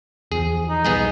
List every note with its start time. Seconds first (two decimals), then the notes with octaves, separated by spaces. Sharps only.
0.32 E2 F3 G#4
0.70 D#4
0.85 B1 G3 B3 G#4 D#5